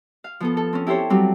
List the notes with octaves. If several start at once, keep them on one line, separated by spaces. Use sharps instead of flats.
F5
F3 B3 A4
A4
C4 C#4
E4 G4 A4 C5 C#5
F#3 G3 C4